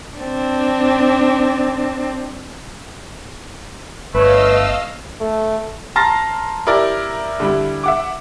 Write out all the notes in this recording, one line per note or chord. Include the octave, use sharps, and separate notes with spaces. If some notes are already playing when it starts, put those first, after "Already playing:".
C4 D4
G1 A3 B4 C#5 D#5 F5 E6
A3
A5 A#5 C6 F6 A6 A#6
E4 G4 A#4 D5
D3 G3 E4
E5 F#5 D6